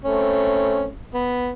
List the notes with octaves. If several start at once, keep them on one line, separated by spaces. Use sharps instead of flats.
A3 C4 C#4
B3